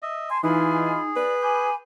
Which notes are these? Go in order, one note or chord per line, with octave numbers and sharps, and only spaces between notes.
D#5 E5
G#5 A5 C6
E3 D#4 F4 G#4 G#5 B5
B4 D5
G#5 B5 D6 G6